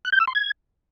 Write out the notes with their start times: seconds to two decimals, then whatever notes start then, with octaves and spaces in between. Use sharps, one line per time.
0.05 F#6
0.12 G6
0.20 E6
0.27 C6
0.35 G#6